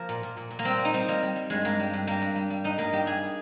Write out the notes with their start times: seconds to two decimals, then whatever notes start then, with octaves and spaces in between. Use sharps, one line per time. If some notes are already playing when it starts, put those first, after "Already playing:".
Already playing: F3 A#3
0.09 A#2
0.23 A#2
0.37 A#2
0.51 A#2
0.59 A#3
0.64 G3 C4
0.79 G3
0.85 D#4
0.93 G3 C4
1.08 G3 A#3
1.23 G3
1.36 G3
1.50 G2 G#3
1.65 G2 A#3
1.80 G3
1.93 G2
2.07 G3 A#3
2.22 G2
2.36 G3
2.50 G3
2.64 G2 D#4
2.78 G2 A#3
2.93 G3 G4
3.06 G2 G#4